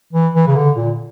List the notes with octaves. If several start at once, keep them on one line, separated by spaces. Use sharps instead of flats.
E3
E3
C#3
D3
A#2